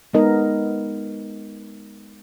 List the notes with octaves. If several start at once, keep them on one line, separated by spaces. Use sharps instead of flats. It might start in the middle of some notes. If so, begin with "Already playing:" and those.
G#3 B3 D#4 A#4 D#5